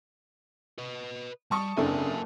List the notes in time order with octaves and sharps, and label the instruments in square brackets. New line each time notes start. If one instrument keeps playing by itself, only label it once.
[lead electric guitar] B4 D#5
[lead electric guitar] G3 [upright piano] A5 C#6 D#6
[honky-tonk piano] F#1 E4 A4 [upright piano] C#3 C4 D4 [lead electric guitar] A#3 G#5